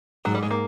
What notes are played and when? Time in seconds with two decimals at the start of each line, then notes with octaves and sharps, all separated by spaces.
0.25 G#2 F#3
0.34 G3
0.43 G#3
0.51 A#3